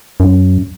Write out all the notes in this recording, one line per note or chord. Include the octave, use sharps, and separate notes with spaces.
F#2